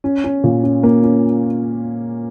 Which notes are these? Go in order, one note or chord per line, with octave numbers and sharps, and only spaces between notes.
C#4
C#4
A#2
C#4
A#3
C#4